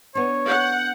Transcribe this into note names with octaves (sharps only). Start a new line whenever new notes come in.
B3 D4 C#5
F#5 G6